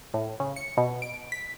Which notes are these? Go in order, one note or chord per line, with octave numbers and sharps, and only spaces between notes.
A2
C#3
C#7
B2
D7
B6